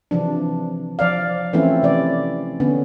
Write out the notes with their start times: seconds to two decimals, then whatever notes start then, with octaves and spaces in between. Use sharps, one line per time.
0.11 C3 E3 F3 D4
0.99 F3 D5 F5
1.53 E3 F3 A3 C4 C#4 E4
1.83 C3 D5
2.60 D3 B3 C#4